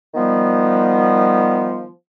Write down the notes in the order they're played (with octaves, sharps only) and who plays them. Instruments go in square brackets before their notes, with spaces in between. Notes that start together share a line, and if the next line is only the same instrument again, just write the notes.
[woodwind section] D#3 F3 G3 B3